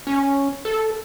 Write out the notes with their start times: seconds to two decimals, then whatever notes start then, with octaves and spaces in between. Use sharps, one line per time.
0.07 C#4
0.65 A4